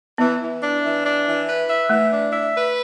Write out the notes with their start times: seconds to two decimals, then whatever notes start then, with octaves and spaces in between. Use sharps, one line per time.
0.18 E3 B3
0.40 E3
0.62 D4
0.83 E3
1.05 D4
1.26 E3
1.48 B4
1.69 E5
1.89 E3 A3
2.11 D4
2.32 E5
2.54 B4